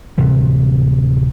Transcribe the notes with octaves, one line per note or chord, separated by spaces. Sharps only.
D1 C3 E3 G3